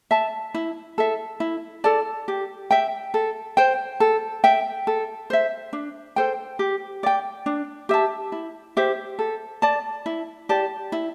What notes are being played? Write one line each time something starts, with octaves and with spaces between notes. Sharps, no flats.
E5 A5
E4
A4 E5
E4
A4 D5 A5
G4
E5 G5
A4
C5 G5
A4
E5 G5
A4
C5 E5
D4
A4 C5 G5
G4
D5 G5
D4
G4 E5 A5
E4
G4 C5 E5
A4
D5 A5
E4
G4 D5 A5
E4